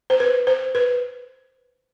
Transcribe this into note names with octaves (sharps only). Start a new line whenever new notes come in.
C5
B4
C5
B4